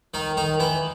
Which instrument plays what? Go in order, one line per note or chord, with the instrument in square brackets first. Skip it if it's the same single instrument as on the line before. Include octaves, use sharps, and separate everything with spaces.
[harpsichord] D#3 D#4
D#3 D#4
E3 E4